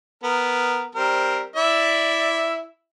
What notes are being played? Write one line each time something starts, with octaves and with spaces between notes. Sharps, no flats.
B3 A#4
G3 C4 A#4
E4 D5 E5